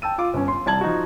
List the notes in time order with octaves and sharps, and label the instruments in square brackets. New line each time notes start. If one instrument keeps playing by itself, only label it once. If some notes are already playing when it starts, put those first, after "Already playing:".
[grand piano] G5 A5 E6 D#7
F4 D6
G1 C#4
C6
C2 G3 A5 G#6 F#7
F3 D#4 F#4